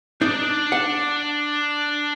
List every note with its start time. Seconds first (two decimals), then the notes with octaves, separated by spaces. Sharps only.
0.21 D4 D#4 D5
0.72 F#5